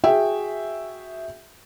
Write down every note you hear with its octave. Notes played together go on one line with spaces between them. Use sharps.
F#4 G#4 E5 G5